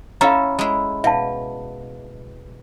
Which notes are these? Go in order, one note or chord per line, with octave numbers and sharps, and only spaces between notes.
C#4 E4 A4 F5 A#5
G#3 E4
B2 E5 F5 A5